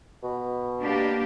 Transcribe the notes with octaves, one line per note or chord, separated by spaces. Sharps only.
B2
A#3 D4 G4